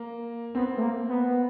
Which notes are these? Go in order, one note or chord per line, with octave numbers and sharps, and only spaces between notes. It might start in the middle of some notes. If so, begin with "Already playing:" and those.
Already playing: A#3
B3 C4
A3
A#3
B3